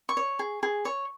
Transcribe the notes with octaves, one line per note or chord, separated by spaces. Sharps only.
C#6
C#5
G#4
G#4
C#5